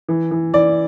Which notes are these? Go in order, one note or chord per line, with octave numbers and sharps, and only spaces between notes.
E3
E3
E3 D5